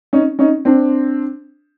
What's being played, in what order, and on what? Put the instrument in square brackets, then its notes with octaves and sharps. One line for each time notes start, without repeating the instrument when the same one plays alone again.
[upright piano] C#4 D#4
C#4 D#4
C4 D4